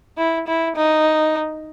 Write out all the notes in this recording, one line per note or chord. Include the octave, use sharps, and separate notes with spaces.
E4
E4
D#4